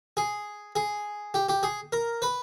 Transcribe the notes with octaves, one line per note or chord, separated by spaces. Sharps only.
G#4
G#4
G4
G4
G#4
A#4
B4